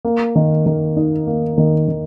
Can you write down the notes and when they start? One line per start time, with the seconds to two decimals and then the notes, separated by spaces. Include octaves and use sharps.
0.05 A#3
0.36 D#3
0.66 D#3
0.97 D#4
1.27 A#3
1.58 D#3
1.88 D#3